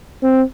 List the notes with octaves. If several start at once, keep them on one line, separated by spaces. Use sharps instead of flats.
C4